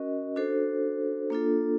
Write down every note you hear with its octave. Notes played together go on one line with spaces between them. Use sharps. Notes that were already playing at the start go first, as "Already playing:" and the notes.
Already playing: C#4 F#4 A#4 D#5
D4 F#4 A4 C5
A#3 D4 F4 A4